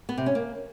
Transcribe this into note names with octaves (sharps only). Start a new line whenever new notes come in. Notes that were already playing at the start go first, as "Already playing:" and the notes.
B3
C3
C#4
A#3